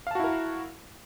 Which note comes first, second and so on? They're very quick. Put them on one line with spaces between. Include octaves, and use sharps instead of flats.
F5 A5 F#4 E4 A#4